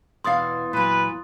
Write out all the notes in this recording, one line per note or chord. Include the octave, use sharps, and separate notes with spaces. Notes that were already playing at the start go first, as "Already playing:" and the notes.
E2 B2 E3 F5 C6 D#6 A6
A#2 F#3 B4